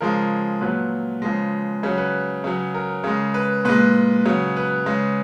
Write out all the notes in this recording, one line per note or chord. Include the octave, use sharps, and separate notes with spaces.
C#3 F3 G#3 A#4
A#2 F#3 B4
C#3 F3 G#3
C#3 F#3
B4
C#3 F#3
A#4
C#3 G#3
B4
A#2 G#3 B4
C#3 F#3
B4
C#3 G#3